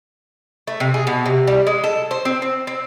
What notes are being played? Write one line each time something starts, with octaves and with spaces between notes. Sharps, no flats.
A3
C3
G#4
B2
C3
G3
G#3
A4
C5
C4
C4
C4